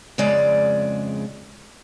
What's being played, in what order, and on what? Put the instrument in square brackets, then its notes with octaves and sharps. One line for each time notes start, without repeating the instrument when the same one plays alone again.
[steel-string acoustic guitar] F2 C#3 G#3 D5